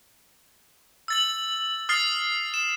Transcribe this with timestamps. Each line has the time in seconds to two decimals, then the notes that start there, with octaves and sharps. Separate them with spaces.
1.08 E6 A6 F#7
1.89 D#6 F6 A6 C7
2.54 E7